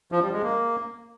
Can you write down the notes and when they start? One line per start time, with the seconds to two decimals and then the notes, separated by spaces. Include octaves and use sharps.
0.12 F3
0.22 G3
0.33 G#3
0.44 A#3